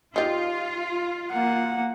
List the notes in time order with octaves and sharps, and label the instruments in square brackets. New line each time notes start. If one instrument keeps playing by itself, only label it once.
[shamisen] D#4 G4 [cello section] F4
[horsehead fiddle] A#3 F#5